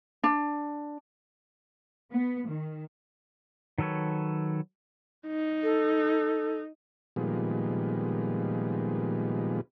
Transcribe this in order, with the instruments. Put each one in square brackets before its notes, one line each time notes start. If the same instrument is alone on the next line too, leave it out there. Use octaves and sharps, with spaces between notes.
[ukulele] D4
[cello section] B3
D#3
[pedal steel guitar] D#3 F#3 A4 B4 C#5
[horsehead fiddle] D#4
[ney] A4
[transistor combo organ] A#2 D#3 F3 G3 G#3 B3